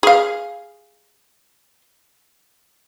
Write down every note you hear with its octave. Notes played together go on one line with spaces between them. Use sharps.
G#4 F5